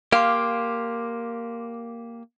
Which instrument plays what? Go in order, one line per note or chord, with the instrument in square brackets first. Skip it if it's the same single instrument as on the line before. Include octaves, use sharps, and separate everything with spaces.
[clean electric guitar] A#3 G4 [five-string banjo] F5 [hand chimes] C6 D6